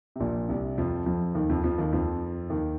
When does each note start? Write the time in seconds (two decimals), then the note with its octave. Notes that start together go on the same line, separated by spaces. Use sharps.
0.16 C3
0.20 A#1 A#2
0.49 C2 C3
0.78 F2 F3
1.06 F2 F3
1.35 D#2 D#3
1.50 F2 F3
1.64 F2 F3
1.78 D#2 D#3
1.92 F2 F3
2.50 D#2 D#3